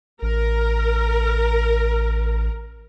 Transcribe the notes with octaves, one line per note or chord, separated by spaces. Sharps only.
A1 A#4